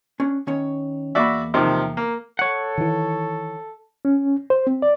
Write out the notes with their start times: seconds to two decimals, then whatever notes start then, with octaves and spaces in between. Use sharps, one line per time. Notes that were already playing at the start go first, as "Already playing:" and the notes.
0.20 C#4 D4
0.47 D#3 C#4 C#5
1.15 E2 A#3 F#4 D5 E5 B5
1.54 C3 D#3 F3
1.97 A#3
2.39 A4 C#5 F#5
2.78 D#3 E3
4.05 C#4
4.50 C5
4.67 C4
4.82 D5